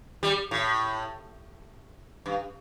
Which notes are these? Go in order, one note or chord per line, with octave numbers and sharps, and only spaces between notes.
G3
A2
G2